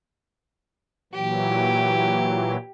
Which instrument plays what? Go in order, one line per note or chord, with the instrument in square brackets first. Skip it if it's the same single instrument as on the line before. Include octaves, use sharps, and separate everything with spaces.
[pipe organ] A#2 E3 F#3 [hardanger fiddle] G4